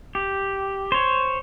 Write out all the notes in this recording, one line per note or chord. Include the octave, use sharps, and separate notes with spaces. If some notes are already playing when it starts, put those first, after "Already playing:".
G4
C5 C#5